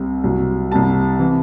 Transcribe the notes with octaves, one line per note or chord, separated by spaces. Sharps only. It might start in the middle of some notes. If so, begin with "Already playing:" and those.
Already playing: C2 C3
C2 C3 F#3
C2 C3 G3 A5
C3 E3